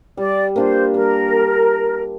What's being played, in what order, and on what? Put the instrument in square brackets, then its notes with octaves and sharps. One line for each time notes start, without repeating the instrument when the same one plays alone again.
[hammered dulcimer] G3 [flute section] D5
[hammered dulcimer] A#3 D4 F4 [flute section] C5
[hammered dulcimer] G3 [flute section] A#4